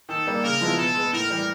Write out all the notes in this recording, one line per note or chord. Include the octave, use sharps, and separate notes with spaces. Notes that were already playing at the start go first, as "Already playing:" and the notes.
D#3 A4
G3 A#3
C#3 A#4
F3 G#3 B3 E4
B2 A4
G#3 B3
A2 A#4
E3 G3